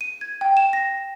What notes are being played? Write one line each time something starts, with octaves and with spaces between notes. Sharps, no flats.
D#7
G#6
G5
E7
A#6